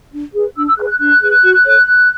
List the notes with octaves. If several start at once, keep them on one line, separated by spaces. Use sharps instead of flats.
D4
G#4 B4
D4 E6
E6
G#4 B4 F#6
F#6
D4 F#6
G#4 B4
F#4
A4 C#5